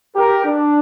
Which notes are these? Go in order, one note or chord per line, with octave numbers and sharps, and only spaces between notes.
G4 A#4
D4